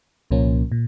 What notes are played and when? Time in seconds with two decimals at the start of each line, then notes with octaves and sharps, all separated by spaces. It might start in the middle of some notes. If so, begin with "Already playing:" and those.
0.31 C2 A#2 F3 A#3 C#4
0.72 A#2